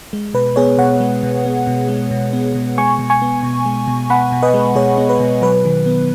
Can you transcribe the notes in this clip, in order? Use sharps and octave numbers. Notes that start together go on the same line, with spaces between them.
G#3
B2 B4
B3 G#4 C#5
B2 C#5 F#5
G#3
B2
B3
B2
G#3
B2
B3
B2
G#3 G#5 C#6
B2
G#5 C#6
B3
B2
G#3
B2
B3 F#5 B5
B2
B4 D#5
G#3
B2 G#4 C#5
B3
B4
B2
F#3 B4
D#3
B3